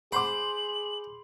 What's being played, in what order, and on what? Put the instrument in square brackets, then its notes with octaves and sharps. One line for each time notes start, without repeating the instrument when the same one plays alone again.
[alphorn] G#4 [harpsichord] C5 [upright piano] B5 C6 D6 [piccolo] F#7